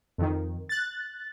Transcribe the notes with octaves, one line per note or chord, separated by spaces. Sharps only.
F2 D#3
F#6 A6